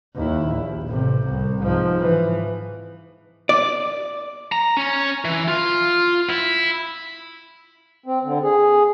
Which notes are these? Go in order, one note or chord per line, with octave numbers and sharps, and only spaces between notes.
D#2 E4
A#1
A1 C3
C2
G#2 F3
E3
D5
A#5
C#4
E3
F4
E4
C4
D3
G#4